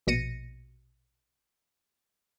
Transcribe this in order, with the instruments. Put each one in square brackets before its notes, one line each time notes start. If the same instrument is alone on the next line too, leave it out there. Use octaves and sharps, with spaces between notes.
[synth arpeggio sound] A#1 B2 A#6 C#7 D#7